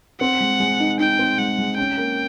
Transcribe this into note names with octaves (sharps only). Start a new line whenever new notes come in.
C4 F#5
G#3
G#3
D#4
D#4 G5
C4
G#3 F#5
G#3
C#4 G5
A#3